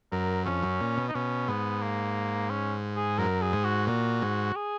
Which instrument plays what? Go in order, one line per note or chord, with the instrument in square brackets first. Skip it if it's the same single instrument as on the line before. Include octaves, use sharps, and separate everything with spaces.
[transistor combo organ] F#2 [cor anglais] A#4
[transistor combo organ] F2 [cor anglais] C#4
[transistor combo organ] F#2
A#2
B2
[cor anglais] D#4
[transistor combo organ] B2 [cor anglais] C#4
[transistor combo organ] G#2 [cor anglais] B3
[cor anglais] A#3
C#4
G#4
[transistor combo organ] F#2 [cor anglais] A#4
[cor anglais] G#4
[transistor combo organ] G#2
[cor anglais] F#4
[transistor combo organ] A#2 [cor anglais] F#4
[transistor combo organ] G#2
[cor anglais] G#4